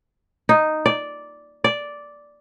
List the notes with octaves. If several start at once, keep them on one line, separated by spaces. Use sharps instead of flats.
D#4
D5
D5